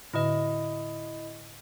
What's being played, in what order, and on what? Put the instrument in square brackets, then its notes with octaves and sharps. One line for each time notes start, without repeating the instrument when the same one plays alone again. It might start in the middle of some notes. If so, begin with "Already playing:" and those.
[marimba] A2 D3 [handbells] E4 D#5